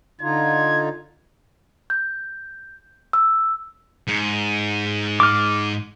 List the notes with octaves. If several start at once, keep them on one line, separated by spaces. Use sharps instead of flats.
D3 D#4 F4 G#6
G6
E6
G#2
D6 F6